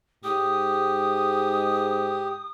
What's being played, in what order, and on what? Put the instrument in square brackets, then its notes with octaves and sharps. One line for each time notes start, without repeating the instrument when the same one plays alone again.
[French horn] G#2 [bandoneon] G4 [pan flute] D#6